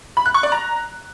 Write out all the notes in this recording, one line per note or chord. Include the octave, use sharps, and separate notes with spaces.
B5
F#6
C#6
D5
A#5